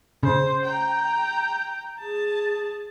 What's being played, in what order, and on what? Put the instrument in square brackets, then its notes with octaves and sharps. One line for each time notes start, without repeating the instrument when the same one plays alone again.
[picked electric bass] C#3 [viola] C5
[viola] G5 A#5
G#4 A5